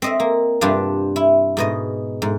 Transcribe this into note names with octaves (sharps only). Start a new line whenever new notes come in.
C4 D#5 E5
A#3
G2 C3 G3 D4 F4
E4
G#2 B2 D#5
G#2